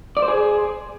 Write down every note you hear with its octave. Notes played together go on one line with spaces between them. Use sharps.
D5
C5
G#4